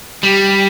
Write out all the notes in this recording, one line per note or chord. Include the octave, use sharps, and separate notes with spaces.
G3